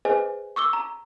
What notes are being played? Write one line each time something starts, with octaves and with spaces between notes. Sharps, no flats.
G#4 B4 C5 D#5 G#5
C#6 D6 E6 G7
A#5